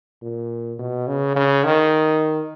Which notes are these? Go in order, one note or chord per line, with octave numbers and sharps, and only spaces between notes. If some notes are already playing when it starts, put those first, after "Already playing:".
A#2
B2
C#3
C#3
D#3